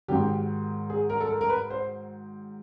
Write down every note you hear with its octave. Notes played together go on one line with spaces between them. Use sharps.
G#2 D#3 F#3 G4
G#4
A#4
A4
A#4
A#4
B4
C5